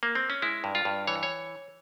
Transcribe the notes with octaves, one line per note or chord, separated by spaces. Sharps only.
A#3
C4
C#4
G#3 E4
G2
F4
G2
E3 C#5
C#5